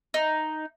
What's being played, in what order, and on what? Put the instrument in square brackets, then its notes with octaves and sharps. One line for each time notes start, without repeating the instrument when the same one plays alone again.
[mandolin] D#4